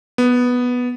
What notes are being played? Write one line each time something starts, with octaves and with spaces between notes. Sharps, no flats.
B3